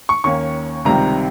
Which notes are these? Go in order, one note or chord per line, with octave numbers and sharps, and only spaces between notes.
C#6
D#2 D#3 A#3 C#4 C#6
C#2 C3 D#3 G3 C4 A#5